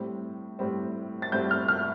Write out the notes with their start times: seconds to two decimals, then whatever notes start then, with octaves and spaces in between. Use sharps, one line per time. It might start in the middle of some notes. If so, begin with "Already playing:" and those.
Already playing: A2 G3 C4
0.59 A2 G3 C4
1.22 A6
1.32 A2 G3 C4 G6
1.51 F6
1.68 F6